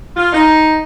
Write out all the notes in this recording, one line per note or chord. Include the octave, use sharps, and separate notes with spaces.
F4
D#4